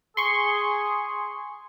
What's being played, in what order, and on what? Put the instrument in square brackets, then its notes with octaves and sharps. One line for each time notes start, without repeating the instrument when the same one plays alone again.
[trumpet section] G#4 [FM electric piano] C6 C#6